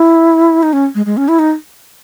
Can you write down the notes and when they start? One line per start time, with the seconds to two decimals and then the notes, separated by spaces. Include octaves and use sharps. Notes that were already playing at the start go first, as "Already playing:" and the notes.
Already playing: E4
0.63 D#4
0.73 C#4
0.95 G#3
1.06 G#3
1.17 C#4
1.28 E4
1.39 D#4